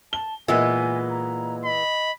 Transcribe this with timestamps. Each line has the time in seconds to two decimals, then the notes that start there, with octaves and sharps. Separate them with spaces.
0.13 A5 G7
0.48 A#2 E3 G#3 B3 D#5 G#5
1.10 A#5
1.65 D#5 B5